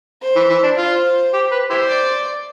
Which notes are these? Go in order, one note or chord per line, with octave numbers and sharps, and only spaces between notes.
C5
E3
E3
D4
F4 C5
G4
B4
E4 G4 C5
D5